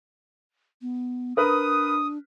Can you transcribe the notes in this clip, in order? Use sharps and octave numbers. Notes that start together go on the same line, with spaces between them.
B3
D4 A#4 B4 D#6